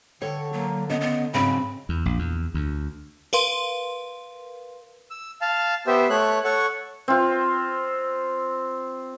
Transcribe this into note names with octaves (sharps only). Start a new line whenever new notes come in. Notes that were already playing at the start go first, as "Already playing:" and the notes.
D3 A4 C#5 G5
F#3 A#3
C#3 B3 D#5
B3
G#2 C#3 F#3 C4 B5
E2
A#1
E2
D2
A#4 B4 F5 C6
E6
F5 A5
B3 G4 C5 E5
A3 C#5 F#6
A4 C#5 F#5 C#6
C4 F4